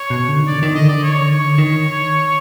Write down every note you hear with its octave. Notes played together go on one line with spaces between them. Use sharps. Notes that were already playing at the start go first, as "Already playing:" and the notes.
Already playing: C#5
B2
D3
D#3
D3 D5
D#3 D5
D3 D#5
D#3 D5
D3
C#5
D#3
D3
D#3 C#5
D3
D#3